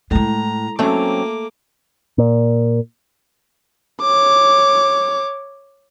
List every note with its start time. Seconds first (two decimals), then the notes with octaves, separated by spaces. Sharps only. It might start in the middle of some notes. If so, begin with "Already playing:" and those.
0.11 A2 G#3 E4 A#5
0.79 F#3 A3 A#3 C4 C#4 D6
2.18 A#2
4.02 C#5 D6